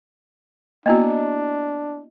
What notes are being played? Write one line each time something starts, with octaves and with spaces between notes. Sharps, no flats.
A#3 B3 D4 E4 F#4 D#5